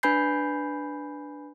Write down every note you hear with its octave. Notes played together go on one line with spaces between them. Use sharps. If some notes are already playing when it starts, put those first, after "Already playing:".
D4 B4 G#5 B5 G6 C7